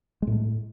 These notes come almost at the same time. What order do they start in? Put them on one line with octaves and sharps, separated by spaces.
G#3 A2 A3